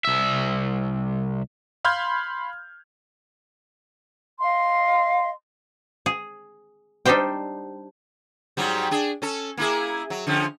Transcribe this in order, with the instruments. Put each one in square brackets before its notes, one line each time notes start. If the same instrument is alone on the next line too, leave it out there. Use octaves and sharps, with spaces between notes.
[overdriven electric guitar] C2 E5
[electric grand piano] F5 B5 C6 F6 G6 G#6
[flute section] D#5 F5 C6
[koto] G#4
G3 D4 D#4 G4 C5 G5
[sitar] G#2 F#3 G3
D4 G#4
C#4 A4
A#3 E4 G#4
F#3
D3 F3 C#4